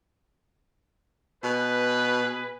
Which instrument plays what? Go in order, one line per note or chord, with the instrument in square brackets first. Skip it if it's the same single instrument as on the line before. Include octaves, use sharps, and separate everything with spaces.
[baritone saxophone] B2 [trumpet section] G#4 B4